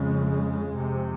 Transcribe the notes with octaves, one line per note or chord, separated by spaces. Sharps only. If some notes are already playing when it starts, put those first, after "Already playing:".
Already playing: F2 C#3 G#3
F2 C3